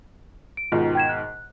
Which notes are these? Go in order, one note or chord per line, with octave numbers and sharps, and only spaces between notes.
D7
G#2 B2 D#3 F4
G5 G#6 E7
F#6